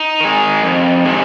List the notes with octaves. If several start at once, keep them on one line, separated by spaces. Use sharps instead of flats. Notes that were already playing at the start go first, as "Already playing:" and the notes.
Already playing: D#4
D#3 G#3
F2
C3 D#3 G#3